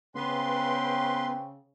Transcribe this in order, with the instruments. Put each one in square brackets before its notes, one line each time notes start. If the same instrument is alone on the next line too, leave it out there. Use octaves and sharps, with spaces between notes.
[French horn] C#3 [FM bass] B3 [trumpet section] C4 C#5 G5 [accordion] B4 C6